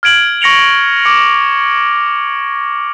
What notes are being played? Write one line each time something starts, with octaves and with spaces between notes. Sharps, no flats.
F6 G#6 D7 F#7
C#6 A#6 C#7 F7 G7
D6 C#7